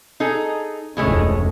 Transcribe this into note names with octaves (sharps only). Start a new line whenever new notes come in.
D#4 G#4 A4
F1 D2 B2 G#3 A3 C#4